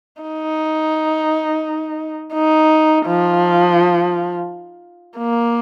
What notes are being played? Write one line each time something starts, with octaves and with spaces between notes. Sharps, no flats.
D#4
D#4
F3
A#3